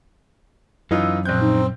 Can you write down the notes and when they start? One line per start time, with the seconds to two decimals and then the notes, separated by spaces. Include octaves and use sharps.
0.91 F#2 E3 D#4 F4 E6
1.25 A#1 C4 F#6 G6
1.41 D#4